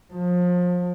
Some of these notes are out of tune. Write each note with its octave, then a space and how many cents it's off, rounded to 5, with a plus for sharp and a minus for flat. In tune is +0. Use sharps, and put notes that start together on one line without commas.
F3 +30